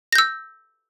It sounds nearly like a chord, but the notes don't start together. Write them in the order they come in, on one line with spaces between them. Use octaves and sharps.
A#6 G6 E6